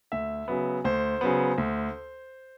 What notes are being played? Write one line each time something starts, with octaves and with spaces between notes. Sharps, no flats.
D2 E5
C#3 F#3 B3
D2 C5
C#3 F#3 B3
D2